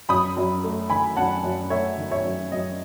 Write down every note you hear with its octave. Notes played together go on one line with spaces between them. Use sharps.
F#2 B5 D#6
F#2
A3
D#3 G#5 B5
F#2 F#5 A5
F#2
A3 C#5 E5
D#3
C#5 E5
F#2
F#2 D#5